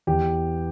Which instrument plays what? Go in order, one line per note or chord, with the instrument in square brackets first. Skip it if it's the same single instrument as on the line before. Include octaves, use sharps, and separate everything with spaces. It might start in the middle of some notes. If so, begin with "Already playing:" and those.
[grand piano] E2 G4